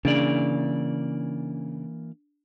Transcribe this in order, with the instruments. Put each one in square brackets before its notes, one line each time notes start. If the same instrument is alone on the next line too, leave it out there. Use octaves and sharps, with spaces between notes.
[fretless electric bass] C#3 [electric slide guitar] E3 A#3 D5 [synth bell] D4